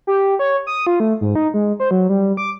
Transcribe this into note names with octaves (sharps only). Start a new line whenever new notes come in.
G4
C#5
D#6
F4
A3
G#2
D#4
G#3
C5
F#3
G3
D6